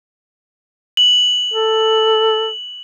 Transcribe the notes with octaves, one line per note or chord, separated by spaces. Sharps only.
F#7
A4